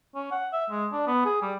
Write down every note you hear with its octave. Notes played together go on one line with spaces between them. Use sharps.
C#4
F#5
E5
G#3
D4
B3
G#4
G3